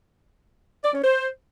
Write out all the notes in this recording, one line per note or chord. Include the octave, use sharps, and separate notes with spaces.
D5
C#4
C5